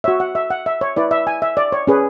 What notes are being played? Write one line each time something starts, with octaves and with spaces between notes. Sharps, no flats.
F#4 C#5 E5
F#5
E5
F#5
E5
C#5
E4 B4 D5
E5
G#5
E5
D5
C#5
C#4 G#4 B4